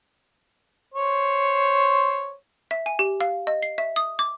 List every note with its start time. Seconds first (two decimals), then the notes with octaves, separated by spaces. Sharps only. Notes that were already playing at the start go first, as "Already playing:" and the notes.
0.94 C5 C#5
2.71 E5
2.86 G#5
2.99 G4
3.21 F5
3.47 D#5
3.63 C7
3.78 E5
3.96 D#6
4.19 D6